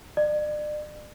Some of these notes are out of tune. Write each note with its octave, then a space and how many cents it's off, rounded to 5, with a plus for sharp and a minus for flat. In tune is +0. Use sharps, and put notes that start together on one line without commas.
D5 +40